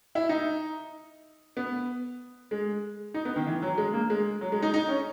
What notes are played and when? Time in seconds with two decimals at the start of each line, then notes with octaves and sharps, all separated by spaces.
0.15 E4
0.29 D#4
1.57 B3
2.51 G#3
3.14 D#4
3.25 B3
3.36 D#3
3.47 E3
3.62 F#3
3.78 G#3
3.93 A#3
4.10 G#3
4.41 F#3
4.52 G#3
4.62 D#4
4.74 D#4
4.89 C#4